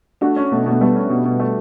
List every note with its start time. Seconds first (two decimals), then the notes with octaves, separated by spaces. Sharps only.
0.21 A3 D4 F#4
0.36 C#4
0.52 B2 A3
0.66 B2 A3
0.80 G3 A3 B3
0.96 C#4
1.10 B2
1.25 B2
1.40 A3